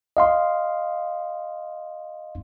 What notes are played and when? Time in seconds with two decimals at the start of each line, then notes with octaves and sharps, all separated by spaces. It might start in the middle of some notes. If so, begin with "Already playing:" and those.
0.17 D#5 F5 C6